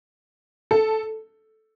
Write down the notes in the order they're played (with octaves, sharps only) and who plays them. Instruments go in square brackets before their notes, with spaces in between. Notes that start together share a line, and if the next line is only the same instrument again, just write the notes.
[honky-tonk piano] A4